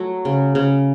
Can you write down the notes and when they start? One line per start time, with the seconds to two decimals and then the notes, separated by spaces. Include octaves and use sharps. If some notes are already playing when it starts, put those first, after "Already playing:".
Already playing: F#3 A3
0.25 C#3
0.55 C#3